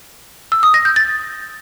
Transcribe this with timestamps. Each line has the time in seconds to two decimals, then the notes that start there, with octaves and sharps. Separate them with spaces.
0.52 E6
0.63 D#6
0.74 A#6
0.85 G6
0.96 A6